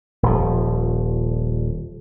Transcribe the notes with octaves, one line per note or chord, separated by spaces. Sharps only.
D#1 F3